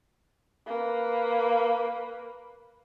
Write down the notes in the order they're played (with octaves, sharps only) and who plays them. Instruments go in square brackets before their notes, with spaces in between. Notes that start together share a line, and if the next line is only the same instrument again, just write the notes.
[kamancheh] A#3 B4